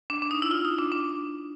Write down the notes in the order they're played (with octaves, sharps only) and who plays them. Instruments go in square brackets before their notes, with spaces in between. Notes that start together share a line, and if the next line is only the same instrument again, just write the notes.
[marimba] D4
D4
D#4
E4
F4
D#4
D4
D4